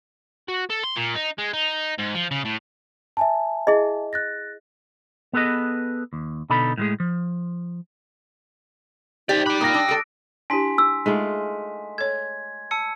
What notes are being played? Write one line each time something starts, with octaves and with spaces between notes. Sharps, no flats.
F#4
A4
C6
A#2
D#4
G#3
D#4
G#2
F3
C#3
A2
E5 G#5 A5
E4 G#4 D#5
F#6 A6 A#6
B3 G#4 A4 B4 D#5
D#2
B2 D3 D#4 A4 B5
A2 G#3 G#4
F3
D#4 G4 C5 D5
G5 B5 D6 F#6
A#3 F4 D#6 A#6
D4 E6
G3 A4 D7
D4 E4 G4 G#5 C6 B6
E6
G#3 A3 D#4 F4
A4 C#5 G#6
A5 E6 C#7